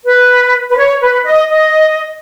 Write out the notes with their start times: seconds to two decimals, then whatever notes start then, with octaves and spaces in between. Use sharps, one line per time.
0.04 B4
0.69 B4
0.77 C#5
1.00 B4
1.25 D#5
1.49 D#5